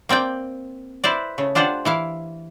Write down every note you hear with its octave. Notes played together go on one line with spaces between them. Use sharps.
A#3 C4 D5 G5
E4 B4 C5 D5
C#3 A3
D4 F4 G4 C5 D5 F#5
E3 E4 F5